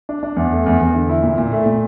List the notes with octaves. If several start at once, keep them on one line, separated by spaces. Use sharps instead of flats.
D4
D4
E2
A3
E2
E2
D3
E4
A#2
A#2
A3
A#2